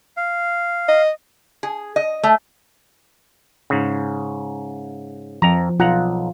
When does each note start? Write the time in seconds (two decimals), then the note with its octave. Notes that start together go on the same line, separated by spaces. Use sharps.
0.17 F5
0.88 D#5
1.63 G#4
1.96 D#5
2.23 A3
3.70 G#2 C#3
5.42 F2 F3 A#5
5.80 B1 F4 F#5 A#5